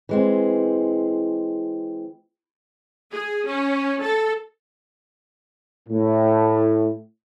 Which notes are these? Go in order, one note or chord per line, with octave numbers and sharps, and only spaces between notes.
E3 G#3 C4
G#4
C#4
A4
A2